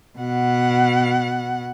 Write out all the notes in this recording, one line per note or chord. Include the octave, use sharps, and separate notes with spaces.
B2 F#5